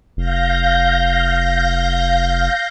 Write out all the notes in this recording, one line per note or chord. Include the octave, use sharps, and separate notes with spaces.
F1 F5 G6 A#6